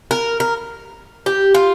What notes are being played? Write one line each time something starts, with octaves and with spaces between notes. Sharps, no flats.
A#4
A#4
G4
F4